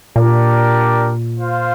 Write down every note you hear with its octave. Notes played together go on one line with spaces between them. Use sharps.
A#2 D4 G4 A#4 D5
F4 C5 F5